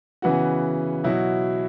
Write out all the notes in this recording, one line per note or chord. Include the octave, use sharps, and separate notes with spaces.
C#3 E3 B3 F#4
B2 F#3 E4